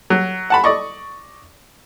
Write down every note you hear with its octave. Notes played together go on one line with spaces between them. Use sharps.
F#3
F#5 A5 B5
D5 D#5 C#6